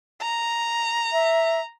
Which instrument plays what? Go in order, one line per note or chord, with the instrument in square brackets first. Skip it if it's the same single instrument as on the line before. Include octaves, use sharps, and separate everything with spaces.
[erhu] A#5
[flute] E5